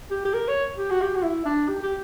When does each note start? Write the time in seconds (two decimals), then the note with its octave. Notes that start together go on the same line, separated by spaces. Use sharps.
0.11 G4
0.25 G4
0.34 A#4
0.48 C#5
0.78 G4
0.90 F#4
1.02 G4
1.15 F#4
1.23 E4
1.45 D4
1.69 G4
1.83 G4